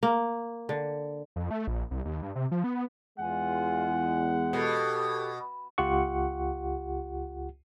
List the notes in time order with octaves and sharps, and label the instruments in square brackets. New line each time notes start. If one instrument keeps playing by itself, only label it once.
[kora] A#3
D3
[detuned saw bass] F2
A3
A#1
C2
D#2
G2
C3
F3
B3
[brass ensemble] E2 G#3 [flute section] F4 G#5 [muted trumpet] F#5
[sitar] B2 [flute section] G4 A4 G#6
[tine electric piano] C#2 F4 G4 F#5 C#6